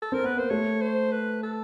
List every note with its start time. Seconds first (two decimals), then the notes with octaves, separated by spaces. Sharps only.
0.02 A4
0.12 C4 A#4
0.24 B3 B4
0.37 A#3 C5
0.50 A3 C#5
0.81 C5
1.12 B4
1.43 A4